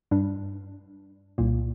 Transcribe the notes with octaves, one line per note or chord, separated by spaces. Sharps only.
G2 G3 D4
C2 A#2 A#3